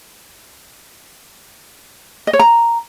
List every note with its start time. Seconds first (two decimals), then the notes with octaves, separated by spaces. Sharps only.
2.27 D#5
2.33 C#5
2.39 A#5